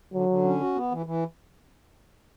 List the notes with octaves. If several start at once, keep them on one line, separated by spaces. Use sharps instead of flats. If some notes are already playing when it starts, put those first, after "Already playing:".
D3 F#3
D3
C#4
F#4
B3
E3
E3